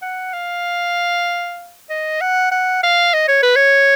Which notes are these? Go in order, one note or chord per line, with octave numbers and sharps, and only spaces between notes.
F#5
F5
D#5
F#5
F#5
F5
D#5
C#5
B4
C#5